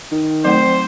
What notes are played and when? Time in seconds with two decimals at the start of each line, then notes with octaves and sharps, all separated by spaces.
0.12 D#3
0.45 F#3 A3 C4 C5